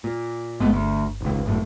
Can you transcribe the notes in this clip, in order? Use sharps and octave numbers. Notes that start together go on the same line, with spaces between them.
A#2
G1 G#3 A3 B3
D2
D#1 C#2
G#1 F#2 A2